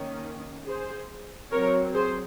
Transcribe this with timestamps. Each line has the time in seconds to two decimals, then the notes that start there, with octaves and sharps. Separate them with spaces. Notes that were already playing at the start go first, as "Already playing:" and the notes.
Already playing: D#3 A#3 C#4
0.66 G#4 C5
1.51 F#3 C4 A#4 C#5
1.94 G#4 C5